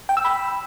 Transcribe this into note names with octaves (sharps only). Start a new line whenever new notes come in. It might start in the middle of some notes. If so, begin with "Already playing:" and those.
G5
E6
B5